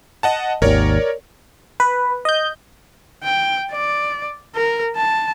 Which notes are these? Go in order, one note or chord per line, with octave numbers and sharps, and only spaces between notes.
D#5 F#5 A5
G#1 D#2 A#4 C#5 D5
B4
D#5 G6
G5
D5
A#4
A5